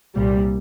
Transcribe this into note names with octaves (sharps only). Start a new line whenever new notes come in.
C2 A#2 G3